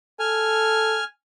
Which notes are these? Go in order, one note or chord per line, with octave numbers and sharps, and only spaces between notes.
A4 G#5 F6